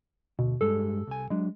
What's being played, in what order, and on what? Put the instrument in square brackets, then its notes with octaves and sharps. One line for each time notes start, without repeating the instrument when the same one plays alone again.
[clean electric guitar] D2 [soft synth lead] B2
[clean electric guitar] G2 G3 G#3 [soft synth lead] A4
[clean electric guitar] C2 G#5
[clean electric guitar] F#3 D4 [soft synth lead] G#3